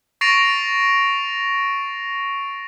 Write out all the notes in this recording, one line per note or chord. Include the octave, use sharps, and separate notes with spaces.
C#6 A6 A#6 C7 D7 F7